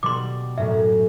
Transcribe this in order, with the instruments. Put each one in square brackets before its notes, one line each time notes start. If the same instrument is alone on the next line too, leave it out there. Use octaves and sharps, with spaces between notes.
[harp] B2 G3 [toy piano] C6 D6
[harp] F#2 A2 [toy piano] E5